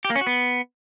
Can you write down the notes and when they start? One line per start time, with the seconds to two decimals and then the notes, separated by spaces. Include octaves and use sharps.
0.05 G4
0.10 A#3
0.16 C#4
0.21 F#4
0.27 B3